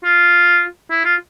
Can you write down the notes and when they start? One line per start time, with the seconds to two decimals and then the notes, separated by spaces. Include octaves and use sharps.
0.04 F4
0.90 E4
1.05 F4